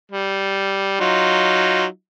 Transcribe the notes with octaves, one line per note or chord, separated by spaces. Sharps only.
G3
F#3 D#4 F4